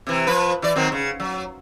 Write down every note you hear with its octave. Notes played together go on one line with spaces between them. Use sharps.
C3 E3
F3 B4
E3 D5
D#3 F#3 C4
C#3
F#3